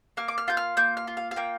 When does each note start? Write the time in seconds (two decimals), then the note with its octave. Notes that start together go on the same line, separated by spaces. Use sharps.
0.17 A#3 F6
0.28 D6
0.38 F6
0.48 F4 G6
0.57 F6
0.77 A#3 G6
0.97 F6
1.07 F4
1.17 F5
1.31 F5
1.36 A#3 G5